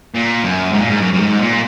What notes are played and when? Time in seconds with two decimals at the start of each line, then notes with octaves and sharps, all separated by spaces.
0.14 A#2
0.43 F#2
0.73 G#2
0.81 A#2
0.90 G#2
1.02 F#2
1.14 F#2
1.21 G#2
1.40 A#2